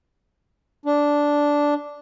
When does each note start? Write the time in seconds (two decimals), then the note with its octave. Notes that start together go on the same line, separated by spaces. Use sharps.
0.86 D4